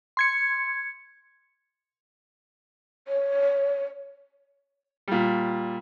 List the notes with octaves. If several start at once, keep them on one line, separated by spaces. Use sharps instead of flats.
C6 G#6 C#7
C#5
A#2 G3